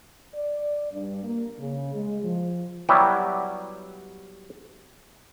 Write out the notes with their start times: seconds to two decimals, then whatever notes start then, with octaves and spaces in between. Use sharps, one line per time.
0.35 D5
0.92 G2
1.24 A#3
1.59 C#3
1.94 G#3
2.23 F3
2.89 F#3 G3 B3 E4 G4